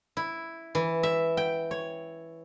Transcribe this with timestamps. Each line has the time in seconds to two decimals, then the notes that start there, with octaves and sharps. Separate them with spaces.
0.17 E4
0.75 E3
1.03 E5
1.37 G5
1.71 C#5